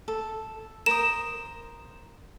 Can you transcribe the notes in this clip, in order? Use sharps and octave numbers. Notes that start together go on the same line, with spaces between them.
A4
A#4 C5 D#6 E7